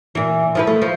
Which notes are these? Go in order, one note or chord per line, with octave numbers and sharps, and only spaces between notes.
A#2 E3
F3 E4 B4
A3
F3